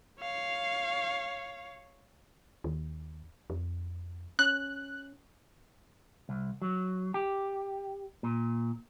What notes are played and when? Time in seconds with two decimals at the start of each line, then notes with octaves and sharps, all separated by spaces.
0.20 C#5 F5
2.64 D#2
3.50 F2
4.39 C#4 F#6
6.29 C2
6.62 F#3
7.14 G4
8.23 A#2